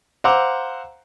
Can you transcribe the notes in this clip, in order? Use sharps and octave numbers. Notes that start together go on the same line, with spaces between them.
C5 F5 F#5 A#5 D6 E6